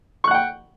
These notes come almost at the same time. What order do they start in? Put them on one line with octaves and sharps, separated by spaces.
C#6 F#6 F#5 G5